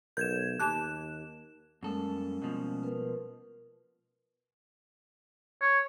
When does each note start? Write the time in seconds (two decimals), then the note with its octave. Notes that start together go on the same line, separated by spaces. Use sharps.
0.17 B1 A#4 G6 G#6 E7
0.60 D#2 G4 A5 D6 F#6 E7
1.83 F#2 G3 G#3 A#3 C#4 A4 A#4
2.42 B2 F3
2.83 A#4 B4
5.61 C#5